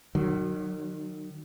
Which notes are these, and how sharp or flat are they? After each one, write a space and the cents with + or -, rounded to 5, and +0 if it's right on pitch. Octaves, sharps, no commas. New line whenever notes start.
D#3 -35 F#3 +0